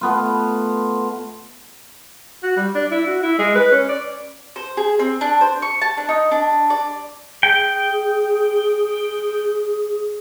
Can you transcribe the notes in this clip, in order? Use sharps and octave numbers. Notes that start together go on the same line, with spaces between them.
A3 B3 F4
F#4
G3
D4
E4
F#4
E4
G#3
B4
C#4
D5
C5
G#4
C4
D4
C5
C#6
A5
D4
D#4
D4
D5
G#4 G5